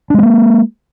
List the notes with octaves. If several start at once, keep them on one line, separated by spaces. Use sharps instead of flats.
G#3 A#3 C4 D4